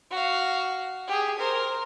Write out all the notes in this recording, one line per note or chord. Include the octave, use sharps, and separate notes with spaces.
F#4 F5
G4 G#4
A#4 C5